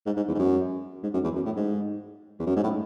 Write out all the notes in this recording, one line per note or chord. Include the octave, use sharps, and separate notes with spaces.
G#2
G#2
E2
G#2
F#2
G#2
F#2
E2
F#2
A2
G#2
E2
F#2
G#2
A2